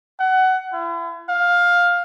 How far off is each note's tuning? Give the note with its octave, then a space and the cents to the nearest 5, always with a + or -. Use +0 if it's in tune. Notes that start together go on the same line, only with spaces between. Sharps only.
F#5 +20
E4 +45
F5 +10